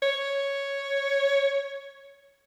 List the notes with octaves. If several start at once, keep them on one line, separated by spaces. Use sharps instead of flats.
C#5